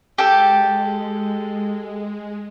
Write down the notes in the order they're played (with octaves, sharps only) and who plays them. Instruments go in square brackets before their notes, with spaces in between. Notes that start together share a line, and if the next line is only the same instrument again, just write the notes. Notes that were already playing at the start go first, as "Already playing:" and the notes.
[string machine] G#3 [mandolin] G4 A4